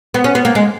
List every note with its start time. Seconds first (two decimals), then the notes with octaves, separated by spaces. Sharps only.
0.14 B3
0.24 C#4
0.35 B3
0.45 A#3
0.55 G#3